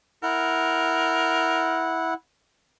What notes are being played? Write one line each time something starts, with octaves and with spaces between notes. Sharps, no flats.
E4 A#4 F#5